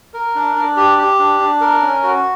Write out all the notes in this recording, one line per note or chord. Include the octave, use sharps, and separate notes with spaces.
A#4
D4
D4
G4
G4
D4
D4
A#4
C#4
F#4